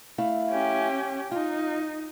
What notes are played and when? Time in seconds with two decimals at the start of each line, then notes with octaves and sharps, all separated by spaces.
0.18 A3 E4 F5
0.50 C#4 G4
1.32 D#4 F4